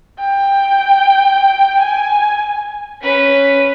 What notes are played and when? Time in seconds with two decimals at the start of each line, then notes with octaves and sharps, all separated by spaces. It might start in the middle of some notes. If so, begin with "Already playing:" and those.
0.19 G5
1.80 G#5
3.02 C#4 B4